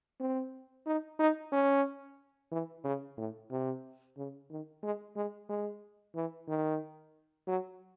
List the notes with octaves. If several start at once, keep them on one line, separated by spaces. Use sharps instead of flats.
C4
D#4
D#4
C#4
E3
C#3
A2
C3
C#3
D#3
G#3
G#3
G#3
E3
D#3
F#3